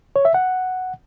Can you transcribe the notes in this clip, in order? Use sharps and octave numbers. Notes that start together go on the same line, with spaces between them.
C#5
E5
F#5